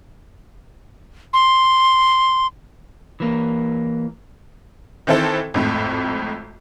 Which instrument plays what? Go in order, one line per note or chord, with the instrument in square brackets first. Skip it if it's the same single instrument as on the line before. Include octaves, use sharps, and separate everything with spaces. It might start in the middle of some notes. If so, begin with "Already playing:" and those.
[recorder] C6
[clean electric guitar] E3 A#3
[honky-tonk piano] D#3 E3 C4 E4 A4 C5
G#1 F2 A2